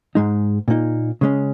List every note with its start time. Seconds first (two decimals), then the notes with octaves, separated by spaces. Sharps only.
0.15 G#2 G#3 D#4
0.68 A#2 A#3 D#4
1.21 C#3 G#3 C#4